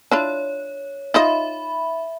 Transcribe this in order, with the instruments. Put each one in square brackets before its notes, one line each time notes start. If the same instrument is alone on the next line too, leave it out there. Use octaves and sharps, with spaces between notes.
[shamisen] D4 E4 F4 [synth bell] C#5
[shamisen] D#4 F4 D#5 [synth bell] E5 B5